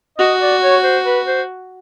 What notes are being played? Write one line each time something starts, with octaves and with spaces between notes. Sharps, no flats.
F#4 D#5
D5
C#5
C5
B4
C5